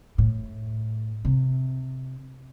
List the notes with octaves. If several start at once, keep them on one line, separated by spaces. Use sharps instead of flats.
A2
C3